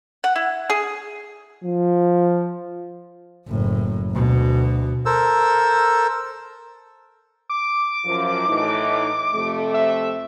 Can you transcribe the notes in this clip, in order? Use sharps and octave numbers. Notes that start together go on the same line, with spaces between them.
F#5
E4
G#4
F3
F#1 A2
D2 B2
A4 A#4 C5 E6
D6
F#2 F3
A2 E3 D#4
F2 C3 A3
E5